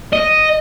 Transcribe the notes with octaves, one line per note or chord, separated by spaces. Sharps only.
D#5